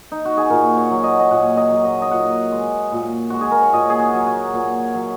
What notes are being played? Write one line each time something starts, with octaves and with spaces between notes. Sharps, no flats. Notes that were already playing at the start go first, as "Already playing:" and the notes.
Already playing: C#4
D#4
F#4
G#4
A#2 A#4
C#5
F#3
D#5
D#5
A#2 F#5
D#5
F#3
D#5
D#5
A#2 F#5
G#3
A#2
G#3 F#4
G#4
A#4
C#5
A#2 D#5
G#4
F#4
F#3
F#4
A#2
F#3